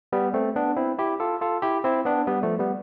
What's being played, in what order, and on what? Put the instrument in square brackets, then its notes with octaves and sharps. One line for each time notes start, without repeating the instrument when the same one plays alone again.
[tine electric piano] G3 B3
A3 C4
B3 D4
C4 E4
E4 G4
F4 A4
F4 A4
E4 G4
C4 E4
B3 D4
G3 B3
F3 A3
G3 B3